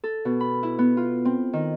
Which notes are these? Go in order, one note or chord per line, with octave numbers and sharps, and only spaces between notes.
A4
B2
B5
E4
B3
F4
C4
D#3